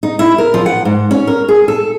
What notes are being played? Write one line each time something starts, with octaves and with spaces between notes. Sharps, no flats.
D#4
E4
A#4
F3
F#5
G#2
C#4
A#4
G#4
A4